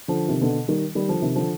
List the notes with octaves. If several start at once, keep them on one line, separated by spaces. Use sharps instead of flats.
D3 F3
C3 D#3
B2 D3
D#3 G3
D#3 G3
D3 F3
C3 D#3
D3 F3